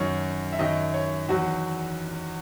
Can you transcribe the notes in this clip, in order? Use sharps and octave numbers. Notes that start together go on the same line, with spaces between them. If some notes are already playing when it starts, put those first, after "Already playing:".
Already playing: F#2 D#3 F#3 C#5
E5
F#2 D#3 F#3 D#5
C#5
E2 D#3 F#3 F#4